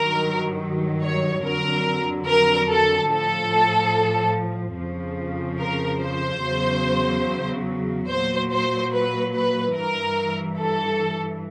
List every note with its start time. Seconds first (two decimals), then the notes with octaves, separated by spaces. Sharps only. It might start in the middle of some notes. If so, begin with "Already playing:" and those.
Already playing: G2 D#3 F#3 A#4
1.03 C#5
1.44 F2 D3 F#3 A#4
2.28 A#4
2.69 A4
3.10 A2 F3 A4
4.77 F2 C#3 F3
5.60 A#4
6.01 C5
6.43 E2 C#3 F#3
8.09 A#2 F#3 C5
8.51 C5
8.93 B4
9.34 B4
9.75 G2 E3 A#4
10.59 A4